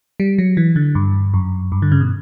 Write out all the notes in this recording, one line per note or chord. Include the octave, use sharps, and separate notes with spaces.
G3
F#3
E3
D3
G2
F#2
G2
D3
C#3
B2